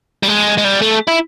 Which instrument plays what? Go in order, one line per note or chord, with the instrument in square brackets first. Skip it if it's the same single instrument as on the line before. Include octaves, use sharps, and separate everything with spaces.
[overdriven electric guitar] G3
G#3
G#3
G3
A3
E4